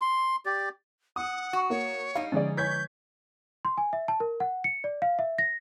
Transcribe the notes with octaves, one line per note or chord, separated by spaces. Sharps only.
C6
G4 D5
F#5 D#6
F#4
A#3 C#5
G3 D#4 F5
D3 F3 G#3 C#4 G#4 D5
B4 C#5 G#5 C#6 G6 G#6 B6
C6
G#5
E5
A5
A#4
F#5
C#7
D5
F5
E5
A#6